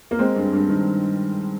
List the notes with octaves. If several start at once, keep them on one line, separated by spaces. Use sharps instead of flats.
A#3
G#3 C4
G2
G2
D#3